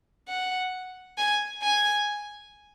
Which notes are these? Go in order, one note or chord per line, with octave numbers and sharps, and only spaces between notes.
F#5
G#5
G#5